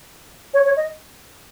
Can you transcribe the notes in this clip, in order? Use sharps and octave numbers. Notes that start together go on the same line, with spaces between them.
C#5
C#5
D#5